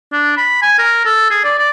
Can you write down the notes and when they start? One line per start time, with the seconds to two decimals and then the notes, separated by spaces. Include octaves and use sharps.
0.12 D4
0.37 B5
0.62 G#5
0.78 A#4
1.05 A4
1.30 G#4
1.44 D5
1.58 D5